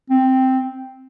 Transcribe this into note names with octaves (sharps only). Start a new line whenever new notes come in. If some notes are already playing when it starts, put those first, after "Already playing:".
C4